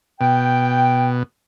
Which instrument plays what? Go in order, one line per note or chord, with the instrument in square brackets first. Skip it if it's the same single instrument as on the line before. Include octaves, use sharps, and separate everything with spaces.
[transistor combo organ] B2 [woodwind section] G5